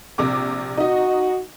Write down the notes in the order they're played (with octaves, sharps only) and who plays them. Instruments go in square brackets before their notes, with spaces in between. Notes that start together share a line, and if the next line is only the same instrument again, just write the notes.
[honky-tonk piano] A#1 C3 D6
[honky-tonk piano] D#4 D#5 [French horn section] F#4